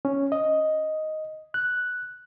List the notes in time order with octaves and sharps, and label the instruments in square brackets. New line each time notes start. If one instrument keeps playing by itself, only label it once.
[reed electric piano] C#4
D#5
F#6